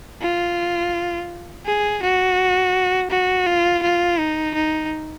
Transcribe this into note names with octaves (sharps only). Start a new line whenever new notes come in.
F4
G#4
F#4
F#4
F4
F4
D#4
D#4